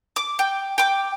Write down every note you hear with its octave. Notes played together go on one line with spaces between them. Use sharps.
D6
G5
G5 D6